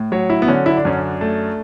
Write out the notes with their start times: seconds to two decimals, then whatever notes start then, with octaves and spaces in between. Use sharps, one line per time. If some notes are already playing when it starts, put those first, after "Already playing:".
Already playing: A2
0.12 F#3 C#5
0.30 E4
0.42 B3
0.48 D3 C#4
0.66 E4
0.77 D4
0.85 F#2 C#4
0.97 D4
1.21 A3